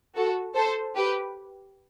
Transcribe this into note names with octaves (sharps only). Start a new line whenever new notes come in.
F#4 A4
A4 C5
G4 B4